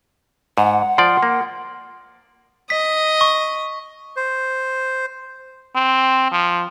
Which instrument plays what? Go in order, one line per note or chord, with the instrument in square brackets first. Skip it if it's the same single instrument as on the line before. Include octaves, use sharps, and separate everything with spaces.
[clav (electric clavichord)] G#2 [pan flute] F#5
[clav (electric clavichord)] F3 D5 [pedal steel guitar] C6
[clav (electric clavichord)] A#3
[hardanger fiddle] D#5 [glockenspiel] B6
[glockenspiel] C#6
[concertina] C5
[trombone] C4
F3